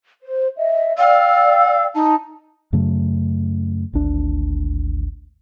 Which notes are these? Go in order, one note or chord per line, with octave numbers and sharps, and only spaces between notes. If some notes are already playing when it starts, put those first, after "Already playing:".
C5
D#5 E5
D5 F5 G5 E6
D#4 A5
F#2 C#3 F#3 A3
G#1 D2 D4